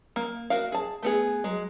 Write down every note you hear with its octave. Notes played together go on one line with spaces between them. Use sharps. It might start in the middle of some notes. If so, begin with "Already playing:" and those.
A#3
F#4 A#4 F5
G#4 A5
A3 B3 G#4
F#3 G#3